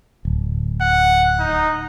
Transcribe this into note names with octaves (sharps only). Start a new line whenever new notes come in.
D1
F#5
D#4